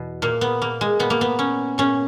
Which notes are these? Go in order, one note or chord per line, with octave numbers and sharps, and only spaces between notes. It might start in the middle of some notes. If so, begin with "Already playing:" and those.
Already playing: E2 B2
A#2 A#3
B3
A#3
G#3
A#2 B3
A#3
B3
C#4
A#2 C#4